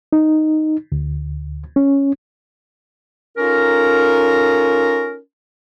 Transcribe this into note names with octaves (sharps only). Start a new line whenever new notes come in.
D#4
D2
C#4
C#4 D#4 F4 A4 A#4